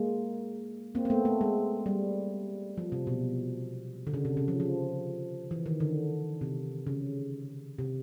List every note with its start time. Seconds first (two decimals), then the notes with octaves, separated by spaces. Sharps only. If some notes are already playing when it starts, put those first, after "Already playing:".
Already playing: G#3 A#3
0.95 A#3 C4
1.05 C4
1.10 A3 B3
1.25 A3
1.41 G#3
1.86 G3
2.78 F3
2.92 C3
3.07 B2
4.07 D3
4.14 C#3
4.25 C3
4.37 C#3
4.48 F3
4.60 F3
5.51 E3
5.66 D#3
5.80 D3
6.41 C3
6.87 C#3
7.79 C3